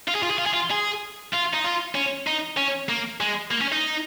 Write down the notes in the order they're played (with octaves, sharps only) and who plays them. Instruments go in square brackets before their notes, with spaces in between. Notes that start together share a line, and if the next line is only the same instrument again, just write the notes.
[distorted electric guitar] F4
G#4
F4
G#4
F4
G#4
F4
G#4
F4
D#4
F4
C#4
D#4
C#4
A#3
G#3
A#3
C#4
D#4